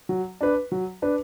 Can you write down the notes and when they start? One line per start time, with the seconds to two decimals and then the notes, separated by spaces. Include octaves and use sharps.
0.09 F#3
0.41 D4 B4
0.72 F#3
1.02 D4 B4